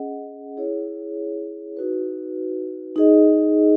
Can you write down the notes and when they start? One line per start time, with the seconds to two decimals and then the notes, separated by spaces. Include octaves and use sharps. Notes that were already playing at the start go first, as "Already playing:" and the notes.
Already playing: C#4 G#4 D#5 F#5
0.57 E4 G#4 C#5
1.77 D#4 F#4 B4
2.96 D#4 G#4 D#5